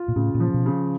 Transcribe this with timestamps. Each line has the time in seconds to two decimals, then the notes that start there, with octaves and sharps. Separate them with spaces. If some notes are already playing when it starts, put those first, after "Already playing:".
Already playing: F4
0.08 A#2
0.16 A2 C#3
0.34 A#2
0.40 F3
0.54 B2
0.66 C#3